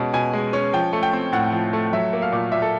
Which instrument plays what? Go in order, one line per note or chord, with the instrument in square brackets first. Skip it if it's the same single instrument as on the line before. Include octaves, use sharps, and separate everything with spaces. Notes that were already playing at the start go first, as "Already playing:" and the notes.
Already playing: [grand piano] B2 G#3 C#4
B2 G#5
G#3
C#4
F3 G5
A3
G5
C4
A2 F#5
F3
A3
F#3 E5
A#3
F5
A#2
A#2 E5
A4